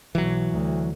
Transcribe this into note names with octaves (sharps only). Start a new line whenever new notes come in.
B1 E3 F#3
D2